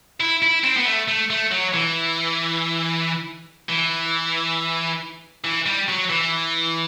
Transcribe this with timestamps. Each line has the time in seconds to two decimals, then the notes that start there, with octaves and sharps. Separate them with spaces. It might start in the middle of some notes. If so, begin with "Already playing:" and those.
0.20 E4
0.42 E4
0.64 C4
0.77 B3
0.86 A3
1.08 A3
1.30 A3
1.51 F#3
1.73 E3
3.69 E3
5.44 E3
5.66 G3
5.88 F#3
6.09 E3